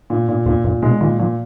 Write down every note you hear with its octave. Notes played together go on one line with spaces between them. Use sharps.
A#2
A#2
E2 A#2
F2 A#2
B2 G#3
A#2 D#3
A#2 F3